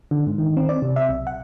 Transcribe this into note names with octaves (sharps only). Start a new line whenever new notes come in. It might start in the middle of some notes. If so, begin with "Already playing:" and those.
D3
G#2
D#3
C4
D5
C3
E5
B1
F#5